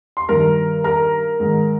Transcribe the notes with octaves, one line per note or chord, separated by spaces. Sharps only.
C6
G2 D#3 A#4 A#5
A#4 A#5
G#2 D#3